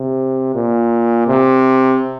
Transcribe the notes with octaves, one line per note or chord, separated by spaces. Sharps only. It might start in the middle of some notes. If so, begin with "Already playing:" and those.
Already playing: C3
A#2
C3